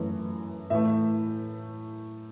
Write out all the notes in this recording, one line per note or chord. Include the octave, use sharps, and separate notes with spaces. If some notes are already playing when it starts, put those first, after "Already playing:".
Already playing: F#2 E3 A3
A2 E3 A3 E5